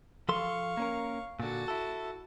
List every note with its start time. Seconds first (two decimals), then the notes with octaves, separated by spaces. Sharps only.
0.29 F3 A4 F5 C6 C#6
0.77 A#3 C#4 A#4
1.40 A#2 D3 F#4 A5
1.68 E4 A4